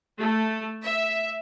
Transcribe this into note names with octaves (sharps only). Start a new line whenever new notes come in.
A3
E5